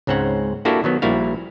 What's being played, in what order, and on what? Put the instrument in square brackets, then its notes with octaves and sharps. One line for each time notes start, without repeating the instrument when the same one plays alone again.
[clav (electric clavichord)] C#2 G#2 C4 C#4 F#5
A#3 D4 E4 F#4 G4 A4
D#3 F#3 B3
A#1 A#2 G3 E4 F#4 F5